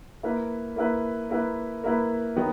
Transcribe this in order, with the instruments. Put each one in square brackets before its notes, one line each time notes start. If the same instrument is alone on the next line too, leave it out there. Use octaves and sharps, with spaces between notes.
[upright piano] A#3 E4 B4
A#3 E4 B4
A#3 E4 B4
A#3 E4 B4
D#3 F#3 B3